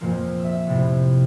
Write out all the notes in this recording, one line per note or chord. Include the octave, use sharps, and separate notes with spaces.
F2 A#2 F3 A#3
E5 E6
F2 A2 C3